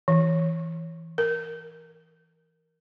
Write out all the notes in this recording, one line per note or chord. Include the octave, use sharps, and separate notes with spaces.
E3
A#4